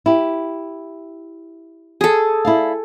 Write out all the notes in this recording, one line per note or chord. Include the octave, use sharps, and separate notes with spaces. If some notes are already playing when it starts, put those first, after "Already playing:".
E4 G4
G#4 A4
E4 D5 F5